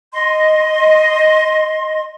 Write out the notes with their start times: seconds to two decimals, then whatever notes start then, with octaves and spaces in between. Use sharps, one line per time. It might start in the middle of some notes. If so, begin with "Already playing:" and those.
0.13 D#5 C6